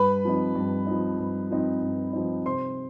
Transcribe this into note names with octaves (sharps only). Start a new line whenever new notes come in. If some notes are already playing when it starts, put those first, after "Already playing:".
Already playing: G2 B4 B5
F3 C4 D#4
G2
F3 C4 D#4
G2
F3 C4 D#4
G2
F3 C4 D#4
C3 C5 C6